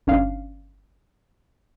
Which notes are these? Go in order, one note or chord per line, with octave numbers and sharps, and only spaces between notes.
G1 C#4 D4 F5